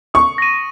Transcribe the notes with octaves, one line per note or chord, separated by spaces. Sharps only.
C#6 D#6
A#6 D#7